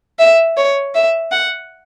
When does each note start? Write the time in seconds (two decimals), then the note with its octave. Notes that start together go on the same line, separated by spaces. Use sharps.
0.19 E5
0.57 C#5
0.95 E5
1.31 F#5